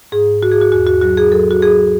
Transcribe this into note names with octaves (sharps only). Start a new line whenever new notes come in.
G#2 G#4
G#2 F#4
G#4
F#4
E2 F#4
F#4
F#3 F#4
G#4
F#3 A4
F#4
F#3 G#4